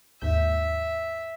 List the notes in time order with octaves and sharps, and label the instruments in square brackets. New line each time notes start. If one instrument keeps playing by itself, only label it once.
[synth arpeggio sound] D#2 G#2 G6 [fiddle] E5